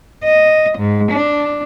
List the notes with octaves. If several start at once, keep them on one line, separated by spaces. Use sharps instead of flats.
D#5
G#2
D4